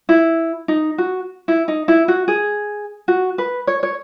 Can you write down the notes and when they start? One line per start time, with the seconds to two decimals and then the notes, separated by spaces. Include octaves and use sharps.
0.09 E4
0.68 D#4
0.98 F#4
1.48 E4
1.68 D#4
1.88 E4
2.08 F#4
2.28 G#4
3.08 F#4
3.38 B4
3.67 C#5
3.83 C#5